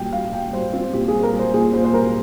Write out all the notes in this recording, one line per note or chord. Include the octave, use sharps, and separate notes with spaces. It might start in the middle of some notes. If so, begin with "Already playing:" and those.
Already playing: A#2 G3 G5
G3 F5
G3 G5
G3 C5
C4 F4
A#2 G4
G#4
G3
A#4
G3
C5
A#2 G#4
A#2 C5
C5
G3 A#4